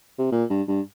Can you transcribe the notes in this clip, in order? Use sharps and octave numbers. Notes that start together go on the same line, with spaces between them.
C3
A#2
G2
G2